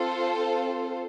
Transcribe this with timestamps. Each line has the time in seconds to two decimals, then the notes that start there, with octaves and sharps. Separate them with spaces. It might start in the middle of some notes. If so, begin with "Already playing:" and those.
Already playing: C4 F4 A4 C5